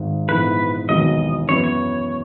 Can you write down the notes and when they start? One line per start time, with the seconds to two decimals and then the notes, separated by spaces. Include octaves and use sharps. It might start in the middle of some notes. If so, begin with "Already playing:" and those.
Already playing: G#1 G#2 D#3
0.28 A#1 G#2 E3 B3 E4 B4
0.89 E1 D#2 D#3 F#3 B3 D#5
1.49 F#2 E3 B3 E4 C#5
1.64 C#5